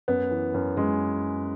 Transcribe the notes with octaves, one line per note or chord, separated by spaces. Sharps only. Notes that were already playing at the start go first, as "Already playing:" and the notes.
F#2 B3
E3
F#2
F#2 G#3